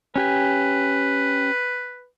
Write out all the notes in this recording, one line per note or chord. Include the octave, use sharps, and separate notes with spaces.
C#4 G4 B4 G#5